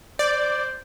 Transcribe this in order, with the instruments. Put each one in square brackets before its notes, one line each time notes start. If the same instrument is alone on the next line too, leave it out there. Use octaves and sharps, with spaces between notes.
[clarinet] C5 [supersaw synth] D5